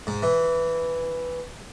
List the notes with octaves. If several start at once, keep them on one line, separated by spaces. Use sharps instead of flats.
G#2
E3